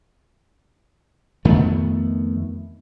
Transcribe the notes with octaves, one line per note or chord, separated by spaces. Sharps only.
F2 D#3 A3 B3